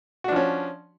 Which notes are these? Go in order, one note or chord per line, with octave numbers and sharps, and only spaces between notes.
F3 C#4 D4 F#4